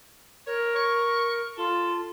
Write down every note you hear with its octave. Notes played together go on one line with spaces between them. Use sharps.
A#4 C#5
C#6
F4 A4